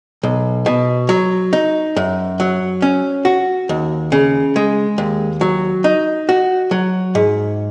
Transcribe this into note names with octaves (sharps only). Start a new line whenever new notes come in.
B1
B2
F#3
D#4
F#2
F#3
C#4
F#4
D#2
C#3
G#3
D#2
F#3
D#4
F#4
F#3
G#2